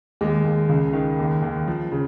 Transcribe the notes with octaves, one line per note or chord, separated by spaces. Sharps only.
D#2 G#3
D#2
C#2
D#3
D#2
D#2
F3
C#3